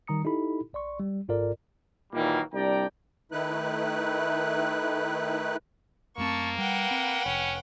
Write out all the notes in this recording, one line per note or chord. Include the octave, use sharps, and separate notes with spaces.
D#3 G3 A#5 D#6 C#7
D#4 E4 G4 A4 B5
A#1 D5 C6 C#6
G3
G#1 G#2 F4 A4 A#4 D5
A#2 D#3 E3 F#3 G3 A#3
C2 G3 D4 D5 G5 A#5
D#3 A3 D#4 E4 B4 F#6
F#2 A3 A#3 C4 A5 C#6 E6
G3 B4 F#5 G5
C4
F1 C#4